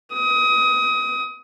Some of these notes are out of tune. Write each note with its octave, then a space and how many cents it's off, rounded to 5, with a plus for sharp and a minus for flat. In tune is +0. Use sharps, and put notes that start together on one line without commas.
D#6 +25